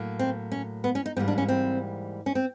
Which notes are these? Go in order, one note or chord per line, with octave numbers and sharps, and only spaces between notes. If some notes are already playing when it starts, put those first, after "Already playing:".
Already playing: A2 F#3 A#3
C4
C#4
B3
C#4
D#4
G#2 E3 G3 A#3 C4
D4
C#4
C4
C#4
C4